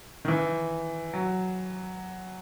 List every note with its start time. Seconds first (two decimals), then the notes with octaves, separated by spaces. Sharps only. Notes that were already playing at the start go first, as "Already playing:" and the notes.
0.25 D#3
0.28 E3
1.13 F#3